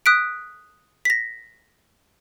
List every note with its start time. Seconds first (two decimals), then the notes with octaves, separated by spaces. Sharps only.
0.06 D#6 F#6 B6 D7
1.05 A#6 B6